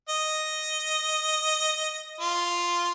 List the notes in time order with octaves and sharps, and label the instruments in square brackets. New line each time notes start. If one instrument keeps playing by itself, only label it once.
[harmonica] D#5
F4